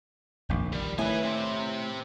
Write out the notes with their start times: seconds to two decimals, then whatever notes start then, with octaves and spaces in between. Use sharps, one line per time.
0.49 F1 A#1 D#3
0.73 D#3 G3
0.99 A2 E4 B4 G#5
1.23 C4 G4